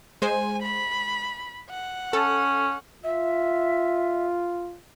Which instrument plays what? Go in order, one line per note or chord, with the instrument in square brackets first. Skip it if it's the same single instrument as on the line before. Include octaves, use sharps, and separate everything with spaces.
[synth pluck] G#3 C5 [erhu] G#5
[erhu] B5
F#5
[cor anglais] C#4 [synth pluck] A4
[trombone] F4 [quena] E5